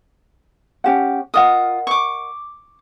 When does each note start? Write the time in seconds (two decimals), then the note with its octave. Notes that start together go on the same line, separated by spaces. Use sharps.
0.84 C#4 G4 F#5
1.34 F4 A#4 D#5 F#5 D#6
1.87 C#6 D6